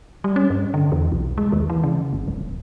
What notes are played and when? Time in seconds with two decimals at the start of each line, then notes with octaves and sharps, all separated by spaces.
0.24 G3
0.36 C#4
0.50 G2
0.74 D3
0.92 E2
1.12 B1
1.38 G#3
1.52 D#2
1.70 E3
1.84 C#3
2.13 G1
2.28 D1